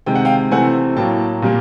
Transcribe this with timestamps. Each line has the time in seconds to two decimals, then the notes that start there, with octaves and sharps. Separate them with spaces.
0.06 C3 D#3 G#3 G5
0.15 F#5
0.25 F5 G5
0.51 C3 E3 A3 C4 F#5 G#5
0.96 A2 F#3 A#3 G5 A5
1.42 A#2 G3 A#3